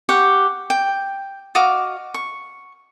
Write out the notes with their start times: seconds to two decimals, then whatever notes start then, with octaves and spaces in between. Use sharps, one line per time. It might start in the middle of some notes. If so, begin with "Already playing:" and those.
0.09 G4 F#5 C#6
0.70 G5
1.55 F#4 D#5 F5 D6
2.14 C#6